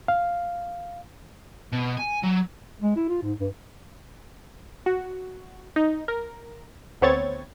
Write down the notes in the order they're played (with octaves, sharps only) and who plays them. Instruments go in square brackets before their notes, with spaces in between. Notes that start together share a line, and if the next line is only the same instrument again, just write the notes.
[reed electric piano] F5
[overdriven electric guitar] B2
G#5
F#3
[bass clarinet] G#3
E4
F4
G#2
G2
[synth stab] F#4
D#4
A#4
D2 B3 C4 C#5 G#6 A6